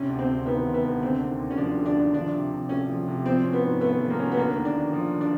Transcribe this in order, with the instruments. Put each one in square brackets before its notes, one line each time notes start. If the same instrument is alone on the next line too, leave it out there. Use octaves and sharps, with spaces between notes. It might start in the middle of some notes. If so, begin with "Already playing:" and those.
Already playing: [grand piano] C3 [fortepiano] C#4
[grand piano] D2
[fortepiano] C4
[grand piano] D2
[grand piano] D#3 [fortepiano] B3
[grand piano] C3
[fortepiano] B3
[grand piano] D2
[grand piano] D3 [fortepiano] C4
[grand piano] D#2
D#2
[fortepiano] C#4
[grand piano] F3 [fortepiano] D4
[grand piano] D3
[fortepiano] D4
[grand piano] D#2
[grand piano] F3 [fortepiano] D4
[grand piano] C3
C3
[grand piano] A3 [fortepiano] C#4
[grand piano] F3
C3
[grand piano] F3 [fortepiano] C4
[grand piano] C#4
[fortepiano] B3
[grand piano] G#2
[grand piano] A3 [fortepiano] B3
[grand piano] F3
[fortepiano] A#3
[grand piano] C#4
[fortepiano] B3
[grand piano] D3 [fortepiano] A#3
[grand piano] D#2
[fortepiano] D4
[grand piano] D#2
F3
D3
[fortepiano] D4